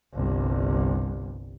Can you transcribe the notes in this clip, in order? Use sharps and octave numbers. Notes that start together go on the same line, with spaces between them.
G1 C2